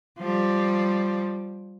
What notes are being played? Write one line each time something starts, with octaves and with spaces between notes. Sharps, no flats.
F3 G3